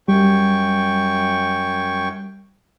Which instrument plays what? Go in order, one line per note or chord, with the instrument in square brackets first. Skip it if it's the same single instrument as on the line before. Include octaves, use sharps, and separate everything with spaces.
[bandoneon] F#2 G5 C#6 [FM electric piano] G3